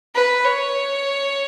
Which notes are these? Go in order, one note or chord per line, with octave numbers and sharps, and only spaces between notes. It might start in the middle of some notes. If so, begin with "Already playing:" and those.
B4
C#5